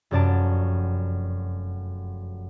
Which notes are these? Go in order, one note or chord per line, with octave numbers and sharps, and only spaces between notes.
F1 F#2 D5 A5